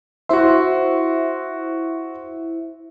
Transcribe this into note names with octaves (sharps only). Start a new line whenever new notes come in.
E4 F#4 C5 E5 C6